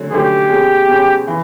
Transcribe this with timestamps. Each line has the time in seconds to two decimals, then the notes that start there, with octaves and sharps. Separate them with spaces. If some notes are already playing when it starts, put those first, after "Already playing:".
Already playing: D3 F#3 A3 C#4
0.12 D3 F#3 A3 C#4 G4
0.49 B2 G#3 C#4
0.88 B2 G#3 C#4
1.27 E3